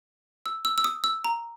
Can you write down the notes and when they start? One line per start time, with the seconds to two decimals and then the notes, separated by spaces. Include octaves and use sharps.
0.46 E6
0.65 E6
0.78 E6
0.84 D#6
1.04 E6
1.24 A#5